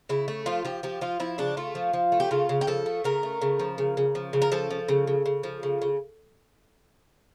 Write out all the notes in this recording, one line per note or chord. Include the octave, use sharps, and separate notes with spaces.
C#3 E4
A3
F3 F4
F3 G4
F3 G4
F3 F4
F3 E4
C#3 D4
A3 F4
F3
F3
A3
G4
C#3 F4
C#3
G4
F3 A4
A3
C#3 A#4
A3
C#3
F3
C#3
C#3
F3
C#3
A#4
F3 A4
F3
C#3
C#3
C#3
F3
C#3
C#3